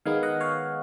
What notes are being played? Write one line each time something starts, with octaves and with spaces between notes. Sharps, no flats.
D#3 G#3 B3 D#4 F5 G#5
D#5 F#5
C#5 F5